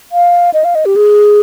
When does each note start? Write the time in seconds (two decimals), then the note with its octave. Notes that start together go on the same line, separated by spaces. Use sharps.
0.12 F5
0.54 D#5
0.64 F5
0.75 D#5
0.86 G4
0.96 G#4